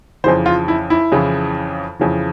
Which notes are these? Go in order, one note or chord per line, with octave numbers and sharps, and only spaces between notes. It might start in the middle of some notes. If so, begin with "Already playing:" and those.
F2 C#3 E3 C5
F4
E4
E4
F2 C#3 E3
F2 C#3 E3